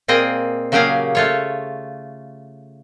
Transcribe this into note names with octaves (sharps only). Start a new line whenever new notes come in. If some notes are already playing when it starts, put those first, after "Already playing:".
A#2 A#3 C4 G#4 D#5
C#3 F#3 A#3 G4 G#4 F5
A3 F4 C#5